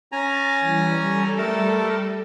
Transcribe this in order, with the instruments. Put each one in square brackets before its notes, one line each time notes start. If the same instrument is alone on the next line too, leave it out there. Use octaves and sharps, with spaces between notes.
[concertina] C#4 G#5 A#5 [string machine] A6
[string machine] E3 G3
G3 A4
[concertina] A3 A#4 A5